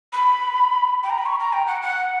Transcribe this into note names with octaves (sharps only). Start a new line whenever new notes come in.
B5
G5
A#5
B5
C#6
A#5
G5
F#5
F#5